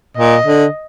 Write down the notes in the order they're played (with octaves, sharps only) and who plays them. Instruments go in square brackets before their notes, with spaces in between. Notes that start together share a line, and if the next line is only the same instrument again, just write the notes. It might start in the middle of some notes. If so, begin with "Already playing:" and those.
[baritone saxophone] A#2 [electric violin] D#5
[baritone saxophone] D3